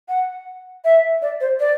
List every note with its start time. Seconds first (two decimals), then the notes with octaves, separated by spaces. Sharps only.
0.09 F#5
0.85 E5
1.22 D5
1.41 C5
1.60 D5